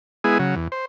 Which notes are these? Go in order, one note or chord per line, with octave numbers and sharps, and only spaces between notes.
G#3 B3 E4 G#4
C#3 F#3
E2
C5